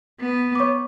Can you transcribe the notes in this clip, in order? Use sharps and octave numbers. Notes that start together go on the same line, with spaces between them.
B3
D6
C#5 C#6